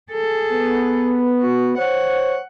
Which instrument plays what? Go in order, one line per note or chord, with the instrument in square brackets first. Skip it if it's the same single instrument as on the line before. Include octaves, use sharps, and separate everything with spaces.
[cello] G#4 A4
[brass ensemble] B3
[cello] F#4
[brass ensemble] C5 C#5 [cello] F#5